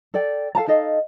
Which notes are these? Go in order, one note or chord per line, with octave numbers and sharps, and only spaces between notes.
A4 D5 G5
A4 F5 A5 A#5
D#4 A4 D#5 F5